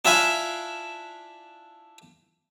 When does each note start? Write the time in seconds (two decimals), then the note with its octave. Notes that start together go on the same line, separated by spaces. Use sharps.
0.05 D4 E4 F4 E5 F5 G#5